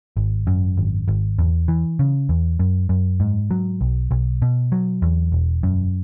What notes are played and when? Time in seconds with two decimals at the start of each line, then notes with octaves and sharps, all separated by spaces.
0.17 G#1
0.47 F#2
0.77 G#1
1.08 G#1
1.39 E2
1.68 E3
1.99 C#3
2.29 E2
2.59 F#2
2.89 F#2
3.20 G#2
3.51 F#3
3.81 B1
4.11 B1
4.42 B2
4.72 F#3
5.02 E2
5.32 E1
5.63 F#2